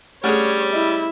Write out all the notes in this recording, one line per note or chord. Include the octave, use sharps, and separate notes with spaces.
G3 A3 C#4 D4 G#4 A4 C#5
E4 D#5